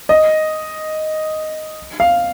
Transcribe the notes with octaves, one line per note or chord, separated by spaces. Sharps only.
D#5
F5